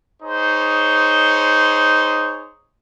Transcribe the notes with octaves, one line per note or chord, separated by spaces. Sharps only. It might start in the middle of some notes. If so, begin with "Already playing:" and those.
D#4 G#4 C5 C#5